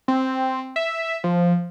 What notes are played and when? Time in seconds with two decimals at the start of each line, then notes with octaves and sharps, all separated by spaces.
0.08 C4
0.76 E5
1.24 F3